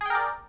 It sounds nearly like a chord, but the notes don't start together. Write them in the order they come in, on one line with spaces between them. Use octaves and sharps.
G#4 G5 A#4 D5